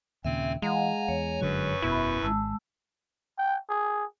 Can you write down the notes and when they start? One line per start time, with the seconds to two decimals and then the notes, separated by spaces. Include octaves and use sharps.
0.25 D#2 A#2 C#3 C4 E5 G#5
0.62 E3 G#3 F5 F#5 G#5 A#5
1.08 E2 C#5
1.41 G1 F#2 D3 F#3 B4 C#6
1.82 E1 B2 E4 B5
2.23 G#1 G#3 A5 E6
3.38 G5
3.70 G#4